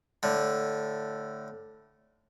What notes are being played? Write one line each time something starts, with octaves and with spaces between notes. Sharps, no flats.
A2 D3